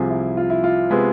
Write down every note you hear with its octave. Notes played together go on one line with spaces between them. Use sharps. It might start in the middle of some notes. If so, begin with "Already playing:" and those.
Already playing: C2 C3 F3 G#4
E4
F4
E4
F4
C3 G#3 B3